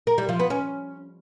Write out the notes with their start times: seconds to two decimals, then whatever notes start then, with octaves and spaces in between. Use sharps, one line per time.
0.07 A#4
0.18 G3
0.29 F3
0.39 B3
0.50 C#4